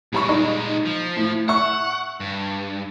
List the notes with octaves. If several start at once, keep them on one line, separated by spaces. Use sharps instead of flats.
A#2 G3 G#3 B5 C#6
D#4
F3
A2
E5 F#5 C#6
G2